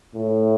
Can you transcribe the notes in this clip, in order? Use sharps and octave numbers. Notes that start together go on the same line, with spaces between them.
A2